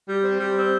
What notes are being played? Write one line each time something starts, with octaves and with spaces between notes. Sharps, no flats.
G3
C4
G3
C4